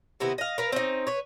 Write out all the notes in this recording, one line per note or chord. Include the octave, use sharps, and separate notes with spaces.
C3 D#3 B3 E4
D#5 F5
A#4 B4 F5
C4 C#4 D#4
B4 C#5